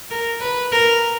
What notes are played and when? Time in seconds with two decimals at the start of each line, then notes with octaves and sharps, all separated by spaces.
0.10 A#4
0.41 B4
0.72 A#4